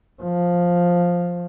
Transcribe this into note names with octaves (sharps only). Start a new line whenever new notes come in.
F3